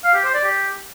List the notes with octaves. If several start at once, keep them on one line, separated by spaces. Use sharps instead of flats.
F5
G4
C5
D5
G4